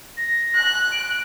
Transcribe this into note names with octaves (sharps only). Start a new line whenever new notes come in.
A#6
F#6
D7